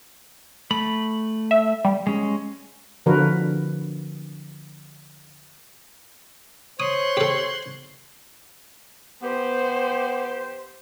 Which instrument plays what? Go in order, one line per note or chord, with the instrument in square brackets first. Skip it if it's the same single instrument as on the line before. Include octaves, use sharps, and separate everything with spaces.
[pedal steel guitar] A3 B5
[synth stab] E5
G3
[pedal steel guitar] G#3 C#4
[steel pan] D3 F3 F#4 A#4 B4
[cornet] C5 [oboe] C#5 [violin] C6 F#6 [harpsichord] D#6
[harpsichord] G4 A4
[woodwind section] B3 G4 [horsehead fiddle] C5